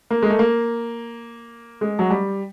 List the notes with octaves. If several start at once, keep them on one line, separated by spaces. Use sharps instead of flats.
A#3
G#3
A3
A#3
G#3
F#3
G3